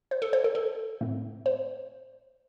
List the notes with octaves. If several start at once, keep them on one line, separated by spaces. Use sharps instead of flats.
C5
A4
C5
A4
A4
A2 A3 C4
C5